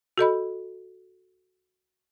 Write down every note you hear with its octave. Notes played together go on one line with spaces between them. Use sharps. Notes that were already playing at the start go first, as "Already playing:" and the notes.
F#4 A4 D#5 B5